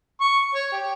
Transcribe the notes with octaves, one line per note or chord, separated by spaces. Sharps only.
C#6
C#5
G4